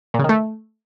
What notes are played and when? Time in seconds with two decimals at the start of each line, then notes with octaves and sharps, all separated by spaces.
0.14 A#2
0.19 C#3
0.24 D#3
0.29 A3